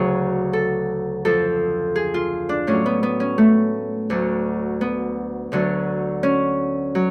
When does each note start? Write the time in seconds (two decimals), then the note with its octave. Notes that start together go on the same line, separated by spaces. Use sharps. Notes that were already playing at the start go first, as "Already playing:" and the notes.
Already playing: D2 C#3 F#3 G#4
0.53 A4
1.25 F2 F3 A4
1.96 G#4
2.14 F4
2.49 D4
2.67 A2 F#3 C#4
2.86 B3
3.03 B3
3.20 C#4
3.38 A3
4.10 D2 D3 F#3
4.81 B3
5.52 D2 D3 F#3
6.23 C#4
6.95 F#3